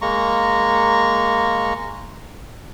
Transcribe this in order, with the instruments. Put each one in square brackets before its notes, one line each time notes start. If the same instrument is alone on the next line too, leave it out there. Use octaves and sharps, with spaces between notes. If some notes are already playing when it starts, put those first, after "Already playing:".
[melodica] G#3 A#3 A#5 C#6